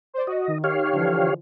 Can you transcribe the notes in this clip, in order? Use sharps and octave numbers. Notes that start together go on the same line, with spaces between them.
C5 D5
F#4 D#5
D#3
G4 C#5 F5
D3 E3 F3